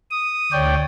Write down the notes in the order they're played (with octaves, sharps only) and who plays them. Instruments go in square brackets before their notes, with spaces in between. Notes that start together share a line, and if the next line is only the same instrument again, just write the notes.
[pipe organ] D#6
D2 C#5 D5 G5